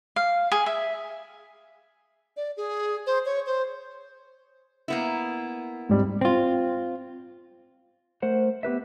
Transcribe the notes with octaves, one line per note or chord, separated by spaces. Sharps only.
F5
G#4
E5
D5
G#4
C5
C#5
C5
A#3 B3 E4
G#2 G3 C4
C4 F4
A3 A#4 C5 F#5
B3 G4 B4 E5